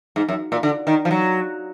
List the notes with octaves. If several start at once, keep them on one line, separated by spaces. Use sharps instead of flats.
G#2
F#2
A#2
D3
D#3
F3
F#3